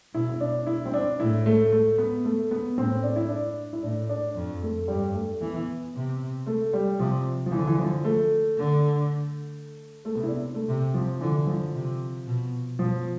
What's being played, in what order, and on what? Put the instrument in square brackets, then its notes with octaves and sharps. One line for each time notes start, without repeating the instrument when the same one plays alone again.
[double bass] B2 [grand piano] E4
[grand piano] E4
D4
E4
C4
D4
[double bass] A2 [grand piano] E4
[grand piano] A3
A3
B3
A3
B3
[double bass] A2 [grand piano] C4
[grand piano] D4
E4
D4
E4
[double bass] A2 [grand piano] D4
[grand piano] D4
[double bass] F2
[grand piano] A3
[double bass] G2 [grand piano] G3
[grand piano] A3
[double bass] E3 [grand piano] B3
[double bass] C3
[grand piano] A3
G3
[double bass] C3 [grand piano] F3
[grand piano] F3
[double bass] D3 [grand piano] E3
[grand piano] E3
F3
A3
[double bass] D3
[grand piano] A3
[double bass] C3 [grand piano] B3
[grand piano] E4
D4
A3
[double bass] C3
[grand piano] F3
[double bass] D3 [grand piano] E3
[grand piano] F3
[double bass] C3
B2
[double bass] B2 [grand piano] F3